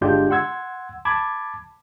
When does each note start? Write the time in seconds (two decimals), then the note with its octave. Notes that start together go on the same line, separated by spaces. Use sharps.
0.01 G1 G#3 D4 F4 G4 G6
0.31 F#5 C6 E6 G#6
1.05 A5 B5 D6 G#6